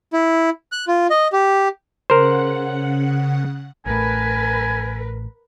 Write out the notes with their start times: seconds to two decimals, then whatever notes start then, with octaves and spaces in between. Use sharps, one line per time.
0.13 E4
0.72 F#6
0.88 F4
1.10 D#5
1.33 G4
2.10 C#3 A#4 C5 F#5
3.86 A1 A2 A#4 B4 G#5